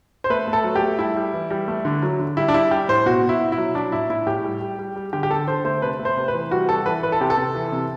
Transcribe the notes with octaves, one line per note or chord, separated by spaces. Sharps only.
C5
A3 B4
A3
A4
F#3
G4
A3
G3 E4
G3
E3
G3
A3
D3
F#3
D3
G3 E4
D4
G3 E4
G3 G4
A2 C5
B2 F#4
B2
E4
B2
E4
F#3
F#3 D4
A2 E4
A2 E4
A2 G4
G3
G3
G3
G3
D3 G4
G4
D3 A4
D3 C5
A3 C5
C3 B4
A3
C5
C3
B4
E3
G3 F#4
G3 A4
E3 B4
E3 B4
A4
C3 G4
A4
C3
E3
C3